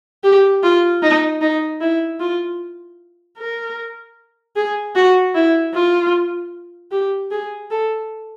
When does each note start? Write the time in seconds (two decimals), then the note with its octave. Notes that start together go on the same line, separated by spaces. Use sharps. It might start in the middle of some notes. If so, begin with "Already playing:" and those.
0.24 G4
0.63 F4
1.02 D#4
1.41 D#4
1.81 E4
2.20 F4
3.38 A#4
4.56 G#4
4.95 F#4
5.35 E4
5.74 F4
6.92 G4
7.31 G#4
7.71 A4